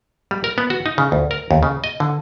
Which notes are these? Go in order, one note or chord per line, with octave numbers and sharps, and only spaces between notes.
G3
A#4
B3
F#4
D#4
C#3
D2
A#4
D#2
C#3
D#5
D3